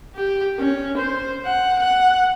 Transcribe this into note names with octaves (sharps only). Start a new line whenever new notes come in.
G4
C#4
C5
F#5
F#5